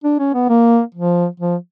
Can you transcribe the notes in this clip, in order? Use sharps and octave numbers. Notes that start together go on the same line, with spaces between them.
D4
C#4
B3
A#3
F3
F3